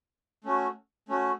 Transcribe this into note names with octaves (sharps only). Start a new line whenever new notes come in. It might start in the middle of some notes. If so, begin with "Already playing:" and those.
A3 C#4 F#4
A3 C#4 F#4